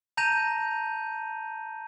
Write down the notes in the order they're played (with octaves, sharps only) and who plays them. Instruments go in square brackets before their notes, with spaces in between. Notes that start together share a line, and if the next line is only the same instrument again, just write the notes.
[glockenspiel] A5 A#5 G6 A#6 D#7 F7